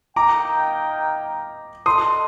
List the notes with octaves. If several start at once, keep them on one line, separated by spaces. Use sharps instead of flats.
A#3 D#4 A#4 D#5 G5 A#5 D6
D4 A4 D#5 G5 C6 D#6